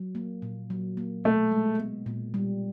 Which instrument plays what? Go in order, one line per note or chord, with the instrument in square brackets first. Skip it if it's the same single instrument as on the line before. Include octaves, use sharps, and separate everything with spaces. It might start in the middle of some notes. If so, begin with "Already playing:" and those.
Already playing: [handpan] F#3
A#3
A#2
F#3
A#3
[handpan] B2 [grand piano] A3
[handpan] G#3
B3
A#2
G3